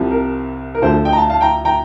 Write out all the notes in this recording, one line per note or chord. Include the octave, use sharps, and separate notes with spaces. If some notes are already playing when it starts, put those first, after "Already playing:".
Already playing: C2 C3 F3
A#4
A#4
D2 D3 F3 A4 C5
A4
D#5 G5
A#5
F5 A5
F5 A5
G5 A#5
G5 A#5